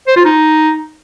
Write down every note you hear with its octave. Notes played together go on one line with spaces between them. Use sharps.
C5
F4
D#4